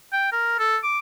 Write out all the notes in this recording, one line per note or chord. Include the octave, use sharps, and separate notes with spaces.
G5
A#4
A4
D6